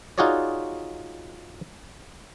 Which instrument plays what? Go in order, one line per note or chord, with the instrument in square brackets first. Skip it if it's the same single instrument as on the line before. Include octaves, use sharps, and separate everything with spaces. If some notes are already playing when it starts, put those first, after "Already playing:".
[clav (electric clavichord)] D#4 F4 F#4 G#4 C#5 D5